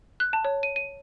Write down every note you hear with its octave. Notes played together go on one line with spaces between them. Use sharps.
F#6
A5
C#5
D#7
D#7